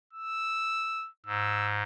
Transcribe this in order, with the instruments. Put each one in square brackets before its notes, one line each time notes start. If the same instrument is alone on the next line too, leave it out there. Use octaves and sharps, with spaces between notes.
[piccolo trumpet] E6
[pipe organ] G#2 [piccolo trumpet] E6